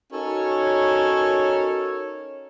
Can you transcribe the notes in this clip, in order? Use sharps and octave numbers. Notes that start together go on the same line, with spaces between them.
C#4 D#4 F#4 A4 A#4 C#5